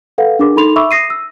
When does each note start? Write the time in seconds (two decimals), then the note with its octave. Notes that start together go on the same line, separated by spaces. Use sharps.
0.18 A4 B4 F5 F#5
0.39 D4 G#4 A#4 D6
0.56 D#4 A4 B5 C6 F7
0.76 E5 B5 C#6 D6 E6
0.91 D#6 A#6 C7 D#7
1.10 E6